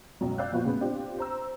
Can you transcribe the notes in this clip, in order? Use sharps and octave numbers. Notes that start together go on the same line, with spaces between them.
C#2 F#2 B2 F#3
D5 F5 E6 F#6 G6
A#2 F3 B3 F4 F#4 F5
A2 C#3 G#3 B3
C4 D4 F4 G4
C5 A#5 E6